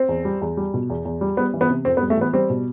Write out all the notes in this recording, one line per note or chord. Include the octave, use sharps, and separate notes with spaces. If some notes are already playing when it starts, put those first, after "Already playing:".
Already playing: C4
E2
G3
E2
G3
B2
E2
E2
G3
G3 B3
E3
B3
C3
F2 C4
B3
G3
A3
E3 B3
G3 C4
B2